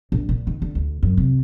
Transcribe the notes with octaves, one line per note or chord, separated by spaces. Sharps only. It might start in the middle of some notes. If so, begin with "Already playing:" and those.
A#1
A#2
D#3
D3
D2
F#2
C3